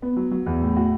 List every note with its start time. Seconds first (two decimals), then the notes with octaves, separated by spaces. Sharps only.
0.02 B3
0.16 F#3
0.31 F#3
0.46 E2
0.62 A2
0.77 F#4